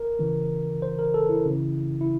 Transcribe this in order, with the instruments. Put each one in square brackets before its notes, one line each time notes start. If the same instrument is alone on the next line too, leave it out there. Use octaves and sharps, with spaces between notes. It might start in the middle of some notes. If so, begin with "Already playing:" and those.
Already playing: [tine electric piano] A#4
C#3 E3
C5
A#4
A4
E4
C#3 E3
E4